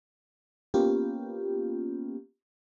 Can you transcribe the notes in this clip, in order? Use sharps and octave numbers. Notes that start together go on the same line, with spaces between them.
A#3 B3 C#4 F4 G4